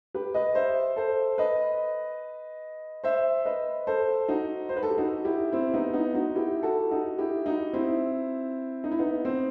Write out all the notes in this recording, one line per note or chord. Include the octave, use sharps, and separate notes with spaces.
G4 B4
B4 D#5
C5 E5
A4 C5
B4 D#5
C5 E5
B4 D#5
A4 C5
D#4 F#4
C5
B4
A4
G4
D#4 F#4
E4 G4
C4 E4
B3 D#4
B3 D#4
D#4 F#4
E4 G4
F#4 A4
D#4 F#4
E4 G4
D#4 F#4
C4 E4
D#4
E4
B3 D#4
C4